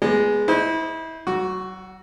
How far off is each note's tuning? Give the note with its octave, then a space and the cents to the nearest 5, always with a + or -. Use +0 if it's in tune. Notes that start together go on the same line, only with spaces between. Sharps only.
G#3 +0 B3 -5 D5 +35
E4 -30 C5 +0 D#5 -25
F#3 +40 F#4 +0 D6 -5